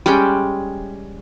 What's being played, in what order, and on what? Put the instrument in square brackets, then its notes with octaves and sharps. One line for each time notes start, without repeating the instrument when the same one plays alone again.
[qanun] G3 G#3 C#4 G5